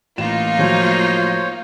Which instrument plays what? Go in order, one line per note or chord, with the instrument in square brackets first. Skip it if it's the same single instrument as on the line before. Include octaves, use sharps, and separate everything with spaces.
[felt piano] A1 E7 [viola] A#3 D#4 [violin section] F4
[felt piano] A2 F3 F#3 [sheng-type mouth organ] C5 C#5